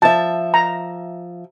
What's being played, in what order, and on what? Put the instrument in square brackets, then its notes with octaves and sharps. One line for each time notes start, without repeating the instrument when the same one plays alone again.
[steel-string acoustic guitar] F3 E5 [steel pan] A5
[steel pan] A#5